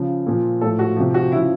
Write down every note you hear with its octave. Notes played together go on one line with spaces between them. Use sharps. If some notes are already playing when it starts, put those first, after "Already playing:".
Already playing: C#3 F3
A#2 F3
A2 F3 A4
F#4
C3 F3
F#4
C#3 F3 E4